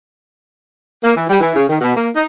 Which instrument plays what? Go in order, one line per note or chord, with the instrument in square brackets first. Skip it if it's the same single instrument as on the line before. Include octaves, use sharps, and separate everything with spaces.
[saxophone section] A#3
E3
G3
E3
C#3
D#3
B2
A#3
D#4